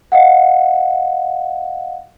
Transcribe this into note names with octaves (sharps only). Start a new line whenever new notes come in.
D#5 F5 F#5